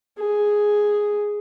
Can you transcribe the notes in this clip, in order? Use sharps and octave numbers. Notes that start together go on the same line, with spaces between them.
G#4